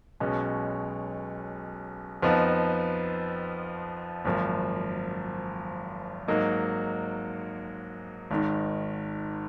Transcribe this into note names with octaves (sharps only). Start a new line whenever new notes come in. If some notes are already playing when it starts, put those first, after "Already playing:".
B1 B2 G#3 C#4
F2 F3 B3 D#4
G#1 F#2 F3 A#3
G#2 F#3 A#3 D#4
G#1 G#2 D#3